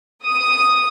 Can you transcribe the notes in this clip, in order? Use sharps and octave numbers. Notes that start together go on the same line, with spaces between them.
D#6